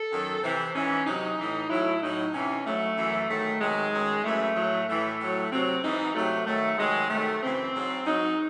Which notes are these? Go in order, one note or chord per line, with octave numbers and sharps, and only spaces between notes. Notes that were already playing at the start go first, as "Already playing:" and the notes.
Already playing: A4
F#2 D#3 F#3
C3 E3 C5
G#2 E3 C#4
C3 F#3 D#4
A2 E3
A2 F#3 E4
A2 F#3 D#4
C3 E3 C#4
G#2 F#3 A3
F#2 E3
G#2 D#3 F#3 A3
C3 D#3 F#3 G#3
F#2 D#3 F#3
F#2 E3 A3
A2 F#3
A2 E3 A3
A2 F#3
C3 F#3 C4
G#2 E3 D#4
C3 F#3 A3
G#2 D#3 F#3 A3
C3 D#3 F#3 G#3
C3 D#3 F#3 A3
F#2 C#3 E3 C4
G#2 F#3
G#2 F#3 D#4